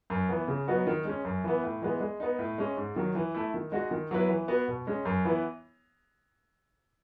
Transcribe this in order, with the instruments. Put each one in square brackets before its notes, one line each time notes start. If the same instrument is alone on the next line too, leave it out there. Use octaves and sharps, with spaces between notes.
[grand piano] F#2
E3 B3
C#3
F#3 B3 D#4 F#4
D#3
G#3 C#4
F#2
E3 B3
A2
E3 G#3 B3
G#3
B3 D#4
A2
G#3 C#4
G#2
D#3 F#3
E3
A3 E4
D#3
G#3 D#4 F#4
D#3
F#3 B3 E4 B4
E3
B3 F#4
B2
G#3 C#4
F#2
E3 B3 E4